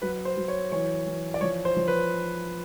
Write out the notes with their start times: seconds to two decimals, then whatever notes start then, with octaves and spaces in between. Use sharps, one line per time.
0.02 F#3 B4
0.25 C5
0.37 F#3
0.48 C#5
0.72 E3 C#5
1.06 E3
1.34 D5
1.41 F3 C#5
1.65 C5
1.76 F3
1.88 B4